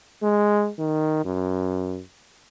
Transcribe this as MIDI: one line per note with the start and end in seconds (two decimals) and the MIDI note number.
0.23 0.70 56
0.79 1.21 51
1.25 2.00 42